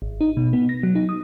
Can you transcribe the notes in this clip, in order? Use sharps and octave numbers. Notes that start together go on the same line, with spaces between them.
G#1
D#4
B2
B3
A#6
F#3
D#4
D#6